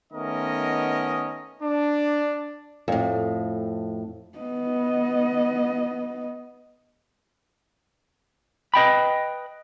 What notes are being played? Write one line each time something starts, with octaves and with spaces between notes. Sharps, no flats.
D#3 A3 B3 C#4 A#4 D#5
D4
F2 A2
B3 D#5
B4 D#5 G5 B5